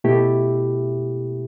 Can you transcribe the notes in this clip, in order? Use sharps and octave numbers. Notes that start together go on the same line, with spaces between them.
B2 A3 E4 G4